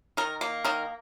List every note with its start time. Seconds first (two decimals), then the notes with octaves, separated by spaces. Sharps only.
0.17 D#3 A#4
0.41 A#3
0.65 D#3 A#4